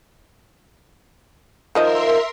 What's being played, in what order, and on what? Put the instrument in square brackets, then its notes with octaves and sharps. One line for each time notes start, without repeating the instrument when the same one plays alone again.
[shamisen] D#3 F3 D#5 [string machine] A#4 E5 C6